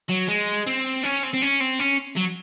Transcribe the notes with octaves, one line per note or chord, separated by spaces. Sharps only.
F#3
G#3
C4
C#4
C4
C4
C#4
C4
C#4
F#3